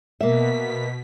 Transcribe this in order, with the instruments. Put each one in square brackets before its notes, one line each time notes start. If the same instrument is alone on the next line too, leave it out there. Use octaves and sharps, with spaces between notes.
[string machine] B2 B6 [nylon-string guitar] A#3 E5